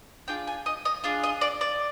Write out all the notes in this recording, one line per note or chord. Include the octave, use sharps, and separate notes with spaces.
D4 F4 G#4 G5
G#5
D#5
D#5
D4 F4 G#4
D#5
D5
D5